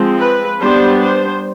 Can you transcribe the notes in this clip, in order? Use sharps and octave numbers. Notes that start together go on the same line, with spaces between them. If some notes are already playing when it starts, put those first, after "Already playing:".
Already playing: F3 G#3 C4
B4
G3 B3 D4 C5
C5